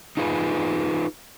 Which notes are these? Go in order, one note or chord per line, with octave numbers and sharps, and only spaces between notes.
D#4 F4 G#4 B4